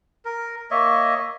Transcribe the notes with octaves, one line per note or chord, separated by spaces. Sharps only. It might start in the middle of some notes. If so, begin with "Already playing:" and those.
A#4
A#3 C#5 D#5 E5